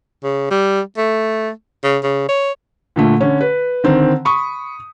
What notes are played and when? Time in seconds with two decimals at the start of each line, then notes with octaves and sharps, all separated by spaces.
0.24 C#3
0.51 G3
0.97 A3
1.84 C#3
2.03 C#3
2.29 C#5
2.96 A#2 D3 A3
3.21 D3 C#4
3.41 B4
3.84 D3 D#3 C4
4.25 B5 C#6 D#6